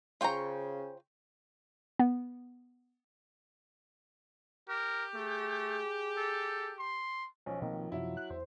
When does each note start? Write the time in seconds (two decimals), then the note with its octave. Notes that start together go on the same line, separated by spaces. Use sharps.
0.21 C#3 F4 C5 G5 A#5 C#6
1.99 B3
4.69 G4 A#4
5.14 A3 G#4
6.17 A4
6.79 C6
7.46 B1 F3 C#4
7.62 B2 D#3 A#3 C4
7.92 F#2 C3 F#3 E4
8.17 F#6
8.30 E2 C5